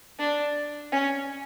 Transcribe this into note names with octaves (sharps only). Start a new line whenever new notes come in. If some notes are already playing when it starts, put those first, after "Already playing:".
D4
C#4